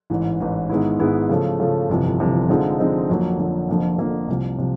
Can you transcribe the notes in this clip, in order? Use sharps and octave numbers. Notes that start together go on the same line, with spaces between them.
A1 G#2 E3
A1 G#2 E3
G#2 D#3 G#3 B3 E4
G#2 D#3 G#3 B3 E4
C#3 F3 A3
C#3 F3 A3
G1 F2 C3 E3
G1 F2 C3 E3
D3 F3 G#3 C4 D#4
D3 F3 G#3 C4 D#4
F2 D3 F#3 A#3
F2 D3 F#3 A#3
F1 F2 D3 F3 A#3
F1 F2 D3 F3 A#3
C2 C3 F3
C3 F3